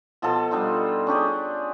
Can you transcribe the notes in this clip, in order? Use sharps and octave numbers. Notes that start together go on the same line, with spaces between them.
B2 F3 F4 A4
G3 D4 D#4 F4
C#4 D4 G4 G#4